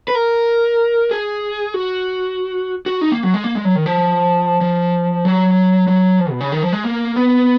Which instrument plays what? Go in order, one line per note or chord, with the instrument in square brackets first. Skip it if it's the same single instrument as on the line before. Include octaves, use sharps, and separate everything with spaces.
[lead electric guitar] B4
A#4
G#4
F#4
F#4
D#4
A#3
F#3
G#3
A#3
G#3
F#3
D#3
F3
F3
F#3
F#3
F3
B2
C#3
D#3
F3
G#3
A#3
B3